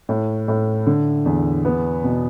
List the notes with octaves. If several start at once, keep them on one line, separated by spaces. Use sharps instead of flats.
A2
A2
D3
E2
B3
B2